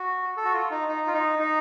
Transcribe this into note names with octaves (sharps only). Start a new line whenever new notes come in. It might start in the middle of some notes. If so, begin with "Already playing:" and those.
Already playing: F#4
A4
F#4
F4
D#4
D#4
F4
D#4
D#4